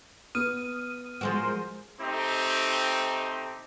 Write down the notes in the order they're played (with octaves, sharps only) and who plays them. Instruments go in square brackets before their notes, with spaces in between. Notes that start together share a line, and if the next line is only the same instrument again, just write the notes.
[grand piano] B3 [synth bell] D#6 F6 D#7
[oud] F3 G#3 F#4 [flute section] A#4 C5
[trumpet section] A3 C4 D#4 G4